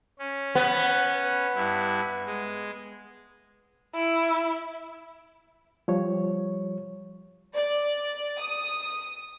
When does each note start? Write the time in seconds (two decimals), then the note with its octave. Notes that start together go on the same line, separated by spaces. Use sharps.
0.19 C#4
0.55 B3
1.56 G2 E4
2.26 G#3
3.94 E4
5.88 F3 G3 C#5
7.55 D5
8.40 D#6